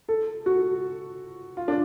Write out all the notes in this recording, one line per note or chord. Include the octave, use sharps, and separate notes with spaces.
A4
F#4
F4
D4